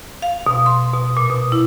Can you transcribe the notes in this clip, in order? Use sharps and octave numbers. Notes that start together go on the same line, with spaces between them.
F5
B2
C6
B2
A#2
B2
E4